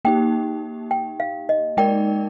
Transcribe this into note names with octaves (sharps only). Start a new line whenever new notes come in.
A#3 D#4 G4 G5
G5
F5
D#5
G#3 D#4 A#4 D5 G5